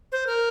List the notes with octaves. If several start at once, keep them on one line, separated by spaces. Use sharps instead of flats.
C5
A#4